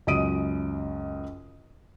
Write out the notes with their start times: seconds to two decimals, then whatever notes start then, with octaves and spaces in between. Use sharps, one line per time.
0.07 C#2 F#2 D#5 D#6 D7 D#7